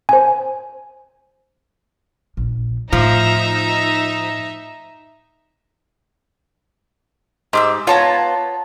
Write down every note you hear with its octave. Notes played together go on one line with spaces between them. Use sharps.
C5 G#5
A#1
A2 F3 D#4 E5 A#5
G#2 G4 D6 E6
B3 F4 C#5 A5 A#5